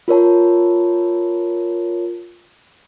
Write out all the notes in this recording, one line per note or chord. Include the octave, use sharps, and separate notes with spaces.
F4 A#4 C#5 A5